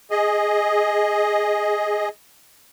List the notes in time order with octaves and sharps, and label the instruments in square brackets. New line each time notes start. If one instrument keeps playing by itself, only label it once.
[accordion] G#4 D#5